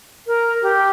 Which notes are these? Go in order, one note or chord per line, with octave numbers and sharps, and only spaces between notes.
A#4
G4